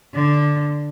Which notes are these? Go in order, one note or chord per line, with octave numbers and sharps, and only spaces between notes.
D3